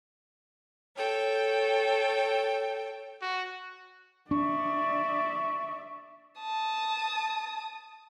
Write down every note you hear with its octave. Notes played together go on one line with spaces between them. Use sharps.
A4 C#5 G5
F#4
D4 D5 E5 C#6
A5 D#6